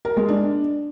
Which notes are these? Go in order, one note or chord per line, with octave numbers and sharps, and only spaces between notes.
A#4
G#3
D4